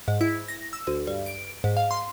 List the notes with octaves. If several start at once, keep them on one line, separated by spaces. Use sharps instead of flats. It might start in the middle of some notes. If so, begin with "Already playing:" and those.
G#2
E4
A#6
E6
D2
G2
D7
G#2
F5
C6